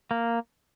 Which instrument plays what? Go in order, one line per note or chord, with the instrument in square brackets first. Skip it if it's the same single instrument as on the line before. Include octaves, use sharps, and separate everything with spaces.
[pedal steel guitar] A#3